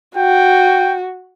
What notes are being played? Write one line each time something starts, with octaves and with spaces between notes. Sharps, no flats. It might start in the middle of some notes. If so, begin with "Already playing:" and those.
F#4 G5